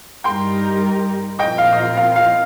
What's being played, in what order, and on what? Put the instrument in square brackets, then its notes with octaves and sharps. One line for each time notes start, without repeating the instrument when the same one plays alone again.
[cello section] G2 G3 D#4 G4 A#4 [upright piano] G5 C6
[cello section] A#2 F3 C4 F4 A#4 [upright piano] D#5 G5
[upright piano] F5
D#5
F5
F5
F5